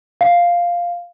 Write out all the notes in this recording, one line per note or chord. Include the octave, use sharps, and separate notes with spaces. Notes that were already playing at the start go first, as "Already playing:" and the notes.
F5